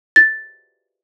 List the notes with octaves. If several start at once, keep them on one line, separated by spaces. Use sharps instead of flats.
A6